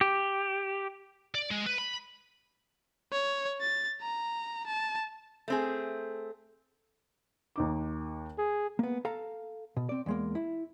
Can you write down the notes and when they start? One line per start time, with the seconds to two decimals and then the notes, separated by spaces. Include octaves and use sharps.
0.01 G4
1.35 D5
1.51 G#3
1.66 B4
1.78 B5
3.12 C#5
3.61 A6
4.01 A#5
4.67 A5
5.48 A3 C4 G#4
7.56 D#2 D#4 D6
8.38 G#4
8.79 A#3 B3
9.05 A4 F5 A#5
9.77 B2
9.89 C4 D5
10.06 E2 G#3 A#3
10.35 E4